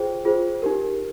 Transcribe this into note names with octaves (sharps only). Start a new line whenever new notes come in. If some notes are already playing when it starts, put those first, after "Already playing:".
Already playing: F4 G#4 C5 G5
F4 G#4 C5
D#4 G4 A#4